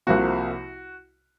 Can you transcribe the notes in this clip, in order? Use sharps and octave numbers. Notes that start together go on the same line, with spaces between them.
C2 C3 F3 A#3 F#4